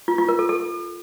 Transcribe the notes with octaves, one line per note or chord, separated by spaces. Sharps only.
F4
F4
A#4
A4
A4